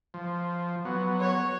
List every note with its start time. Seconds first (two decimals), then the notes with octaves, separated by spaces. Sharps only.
0.14 F3
0.85 F#3 B3
1.20 C#5